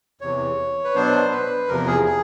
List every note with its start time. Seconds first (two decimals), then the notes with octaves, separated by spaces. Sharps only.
0.21 E2 C3 E3 C#5
0.84 B4
0.95 B2 F#3 B3 D4 C5
1.32 B4
1.68 E2 C3 F3 A#4
1.87 G#4
2.05 G#4